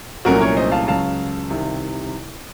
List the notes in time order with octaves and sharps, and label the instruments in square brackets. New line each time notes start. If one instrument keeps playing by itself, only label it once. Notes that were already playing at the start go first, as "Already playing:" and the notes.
[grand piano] C2 A#2 F#3 A3 C#4 F#4 A#4
A#4 C#5
C5 D#5
F5 A5
C#2 C#3 F#3 F5 A5
C2 C3 D#3